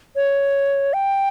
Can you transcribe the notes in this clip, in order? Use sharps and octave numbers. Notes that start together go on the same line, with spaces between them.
C#5
G5